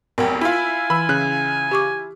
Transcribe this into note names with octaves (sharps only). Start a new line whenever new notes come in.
F1 B1 A#4 F#5 G5
E4 F4 G#5
E3 B5 E6
C#3 F#6
G4 C#6 D6